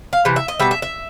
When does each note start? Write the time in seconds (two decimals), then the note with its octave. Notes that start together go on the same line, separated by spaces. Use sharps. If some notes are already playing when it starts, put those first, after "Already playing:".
0.13 F5
0.25 C3 E3
0.36 E5
0.48 D#5
0.59 B2 G3 E5
0.71 E5
0.82 E5